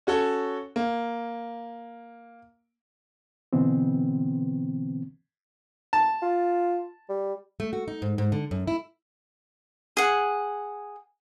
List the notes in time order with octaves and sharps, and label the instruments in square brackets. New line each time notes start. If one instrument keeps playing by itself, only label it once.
[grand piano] C#4 F#4 A4 C#5
A#3
[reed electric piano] B2 D3 E3 B3 C4
[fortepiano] A5
[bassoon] F4
G3
[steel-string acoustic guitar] A3
F#4
D#4
G#2
G#2
D3
F#2
E4
[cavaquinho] G#4 F#5